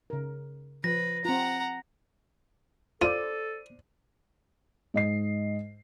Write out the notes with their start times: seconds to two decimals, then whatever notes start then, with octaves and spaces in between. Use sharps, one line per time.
0.10 C#3 A#4
0.84 F3 B4 A#6
1.25 C4 F4 F#5 A#5
3.02 F4 A4 C5 D5 D#7
4.94 G#2 D#5 C7